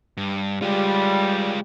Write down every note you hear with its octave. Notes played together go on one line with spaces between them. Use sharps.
G2
G3 G#3 F4